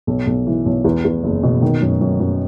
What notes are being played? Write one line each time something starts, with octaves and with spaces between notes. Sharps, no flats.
B1
B1
E3
B1
E2
E2
F#1
B2
D#3
F#2
F#2
F#2